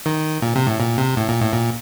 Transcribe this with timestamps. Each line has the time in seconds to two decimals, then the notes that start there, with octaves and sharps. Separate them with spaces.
0.06 D#3
0.42 A#2
0.55 C3
0.67 A2
0.80 A#2
0.98 C3
1.17 A2
1.29 A#2
1.41 A2
1.53 A#2